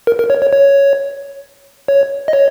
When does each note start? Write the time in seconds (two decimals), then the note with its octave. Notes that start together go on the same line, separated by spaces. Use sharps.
0.07 A#4
0.19 A#4
0.30 C#5
0.42 C#5
0.53 C#5
1.88 C#5
2.28 D#5
2.33 C#5